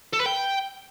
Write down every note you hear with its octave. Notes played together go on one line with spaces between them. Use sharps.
A4
B4
G5